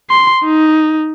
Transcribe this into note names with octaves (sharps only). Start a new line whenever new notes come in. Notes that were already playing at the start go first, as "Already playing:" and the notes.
C6
D#4